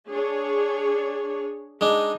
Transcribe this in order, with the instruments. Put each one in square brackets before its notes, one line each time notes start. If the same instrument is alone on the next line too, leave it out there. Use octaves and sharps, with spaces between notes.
[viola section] D4 G#4 C#5
[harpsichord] G#3 D4 [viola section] D#4